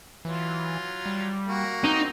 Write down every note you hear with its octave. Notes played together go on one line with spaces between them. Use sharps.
E3 F#3 F4
G3
A#3 F#4
C4 D#4